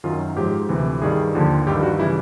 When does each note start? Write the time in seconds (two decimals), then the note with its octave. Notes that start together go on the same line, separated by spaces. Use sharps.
0.04 F#2 D#3 F#3 F4
0.36 G#2 F3 G4
0.69 D2 C3 E3
1.01 G2 D#3 G3 G#4
1.35 D#2 D3 F3
1.67 G2 D#3 G3 G4
1.83 F#4
2.00 C#3 E3 G3 E4